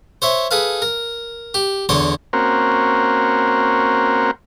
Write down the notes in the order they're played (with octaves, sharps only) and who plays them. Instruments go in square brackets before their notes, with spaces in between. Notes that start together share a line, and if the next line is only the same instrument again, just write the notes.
[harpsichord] C5 C#5 E5
G#4 A4 B4 F5
A#4
G4
E2 D3 C#5 C6 D6
[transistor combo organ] A#3 C4 C#4 F#4 A#4 C5